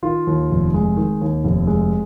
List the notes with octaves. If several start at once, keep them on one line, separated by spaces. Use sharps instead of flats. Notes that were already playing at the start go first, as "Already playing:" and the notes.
D#3 F4
D#2
F1
G#3
D#3
D#2
F1
G#3